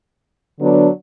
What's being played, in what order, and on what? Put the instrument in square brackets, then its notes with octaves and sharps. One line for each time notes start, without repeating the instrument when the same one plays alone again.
[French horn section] D3 F#3 B3 D4